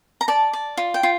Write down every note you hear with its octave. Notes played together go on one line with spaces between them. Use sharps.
A#5
D5 A5
D5
F4
G5
F4